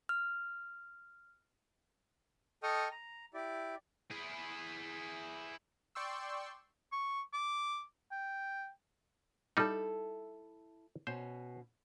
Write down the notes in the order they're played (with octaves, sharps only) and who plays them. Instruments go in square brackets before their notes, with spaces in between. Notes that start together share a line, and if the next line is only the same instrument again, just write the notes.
[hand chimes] F6
[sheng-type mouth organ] A4 D#5 G5 C#6 D#6 F6
A#5
E4 G4 D5
[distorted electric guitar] E4 G#4
[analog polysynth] D5 G5 C6 C#6 E6
[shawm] C#6
D6
G5
[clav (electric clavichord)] G3 D#4 [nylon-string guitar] E4 A4
[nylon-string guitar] B2 C#4 [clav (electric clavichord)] C5